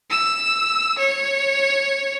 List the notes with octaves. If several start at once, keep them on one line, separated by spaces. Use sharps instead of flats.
E6
C#5